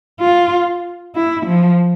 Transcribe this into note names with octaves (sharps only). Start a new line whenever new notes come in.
F4
E4
F3